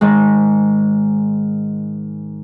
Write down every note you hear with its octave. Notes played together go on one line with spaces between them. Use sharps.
G#2 D#3 G#3